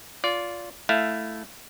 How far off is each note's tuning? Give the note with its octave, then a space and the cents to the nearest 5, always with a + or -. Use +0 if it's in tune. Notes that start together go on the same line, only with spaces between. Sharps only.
F4 +0 D5 -25
A3 +0 E4 +0 F5 +0